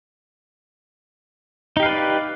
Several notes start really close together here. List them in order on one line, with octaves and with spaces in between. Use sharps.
D#4 G4 F5 B4 D5